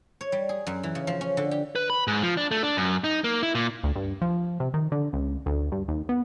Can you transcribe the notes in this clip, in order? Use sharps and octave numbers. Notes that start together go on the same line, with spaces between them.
C#5
G3
G#4
F#2
E3
C#3
F3
C#4
D3
G4
B4
B5
G#2
F3
D4
A3
D4
F#2
D#4
A#3
E4
A#2
D2
G2
F3
C3
D#3
D3
C#2
D2
G2
D#2
B3